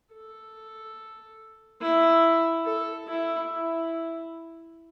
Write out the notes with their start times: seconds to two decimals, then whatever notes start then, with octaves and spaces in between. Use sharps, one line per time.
0.13 A4
1.81 E4
2.65 A4
3.07 E4
3.49 E4